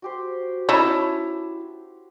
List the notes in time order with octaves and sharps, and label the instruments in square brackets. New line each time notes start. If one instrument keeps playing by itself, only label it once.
[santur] F#4 G4 C5
[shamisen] C#4 D#4 [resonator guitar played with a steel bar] E4 C#5 A5